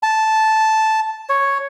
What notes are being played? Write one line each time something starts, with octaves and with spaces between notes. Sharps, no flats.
A5
C#5